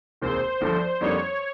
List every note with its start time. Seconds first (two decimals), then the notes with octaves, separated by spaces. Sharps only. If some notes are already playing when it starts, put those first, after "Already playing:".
0.21 E1 D#2 D#3 G#3 C4 C5
0.61 G1 G2 D3 F3 A3
1.01 F2 D3 G3 A#3 D#4 C#5